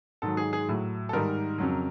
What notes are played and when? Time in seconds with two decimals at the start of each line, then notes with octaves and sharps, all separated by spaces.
0.22 G#2 D#3 F#3 A4
0.37 G#4
0.53 G#4
0.68 A2 F#3
1.09 A4
1.13 G#2 D#3 G3 A#4
1.58 F2 C#3 F#3